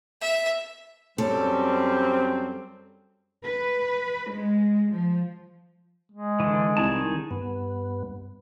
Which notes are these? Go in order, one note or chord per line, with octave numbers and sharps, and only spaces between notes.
E5
F#2 G3 C4 A4 C#5
B4
G#3
F3
G#3
D3 E3
C2 D#3 G#4 A5
G2 B3